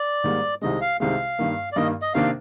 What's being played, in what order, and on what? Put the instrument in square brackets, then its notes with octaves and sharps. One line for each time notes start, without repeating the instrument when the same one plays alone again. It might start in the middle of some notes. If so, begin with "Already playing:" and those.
Already playing: [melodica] D5
[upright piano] G#2 D#3 G3 A#3
[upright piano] C2 C3 D#3 G#3 [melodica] D#5
[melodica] F5
[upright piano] C2 C3 D#3 G#3 [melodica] F5
[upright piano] G2 D#3 A#3
[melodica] D5
[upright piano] G2 D#3 A#3 [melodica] D#5
[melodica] D#5
[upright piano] C3 D#3 A#3 D4 [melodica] F5